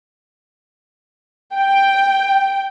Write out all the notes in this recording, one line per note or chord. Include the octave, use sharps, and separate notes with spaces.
G5